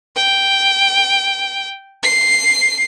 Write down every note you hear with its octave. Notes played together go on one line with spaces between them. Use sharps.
G5
C7